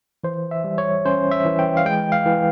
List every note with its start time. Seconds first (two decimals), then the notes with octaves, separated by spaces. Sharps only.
0.24 E3 C5
0.51 E5
0.64 G3
0.78 C#5
1.05 C#4 C5
1.31 E5
1.45 E3
1.59 G5
1.77 F5
1.85 G#3 G5
2.12 F5
2.26 E3